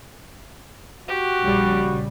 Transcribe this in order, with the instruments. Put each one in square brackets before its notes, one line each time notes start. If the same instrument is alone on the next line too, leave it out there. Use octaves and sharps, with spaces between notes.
[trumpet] F#4 [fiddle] G4
[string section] A#1 C#3 G3